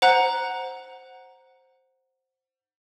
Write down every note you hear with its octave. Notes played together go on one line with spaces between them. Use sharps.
C5 F#5 A#5 F#6